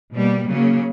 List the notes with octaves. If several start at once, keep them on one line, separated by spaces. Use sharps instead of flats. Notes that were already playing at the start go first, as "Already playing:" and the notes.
B2 G3 A#3
C#3 F#3 A#3